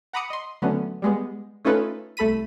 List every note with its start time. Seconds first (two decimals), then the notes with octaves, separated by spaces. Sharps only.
0.13 F#5 A#5 B5 D6 D#6 C#7
0.30 D#5 C6
0.62 D3 F#3 A3 B3 C#4
1.02 G3 G#3 B3
1.65 A3 C#4 D#4 F4 A4 B4
2.17 C2 A3 A4 B5 B6 D#7